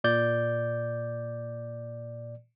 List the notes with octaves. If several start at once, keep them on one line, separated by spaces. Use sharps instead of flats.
A#2 D5 G6